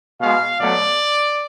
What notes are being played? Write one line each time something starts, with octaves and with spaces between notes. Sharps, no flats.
B2 G#3 F5
B2 F#3 A3 D5